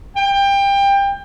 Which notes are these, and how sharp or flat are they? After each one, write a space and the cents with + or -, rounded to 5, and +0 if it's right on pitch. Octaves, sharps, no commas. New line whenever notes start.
G5 +25